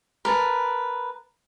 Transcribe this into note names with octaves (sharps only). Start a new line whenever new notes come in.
A#4 B4 A5